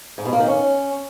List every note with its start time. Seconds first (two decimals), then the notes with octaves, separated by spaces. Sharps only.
0.18 G#2
0.25 B2
0.33 A#3
0.40 D#3
0.48 C#4